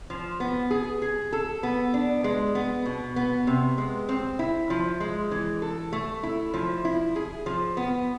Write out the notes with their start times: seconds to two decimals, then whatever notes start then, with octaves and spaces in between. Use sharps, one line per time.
0.10 F3
0.40 B3
0.70 G#4
1.02 G#4
1.33 A4
1.63 B3
1.94 D4
2.24 G#3
2.55 B3
2.86 B2
3.16 B3
3.47 C3
3.78 G#3
4.09 C4
4.39 E4
4.70 F3
5.00 G#3
5.31 E3
5.62 A4
5.93 A3
6.23 E4
6.54 F3
6.85 E4
7.16 G#4
7.46 F3
7.77 B3